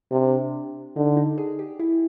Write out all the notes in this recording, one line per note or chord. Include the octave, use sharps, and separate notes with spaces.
C3 D4
D3 D#4
D#4
G#4
G4
E4